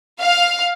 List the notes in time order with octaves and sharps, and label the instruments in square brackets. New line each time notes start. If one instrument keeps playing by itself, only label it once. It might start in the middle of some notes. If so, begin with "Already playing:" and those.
[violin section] F5